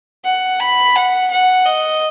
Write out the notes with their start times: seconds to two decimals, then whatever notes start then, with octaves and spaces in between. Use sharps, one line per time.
0.25 F#5
0.60 B5
0.96 F#5
1.31 F#5
1.66 D#5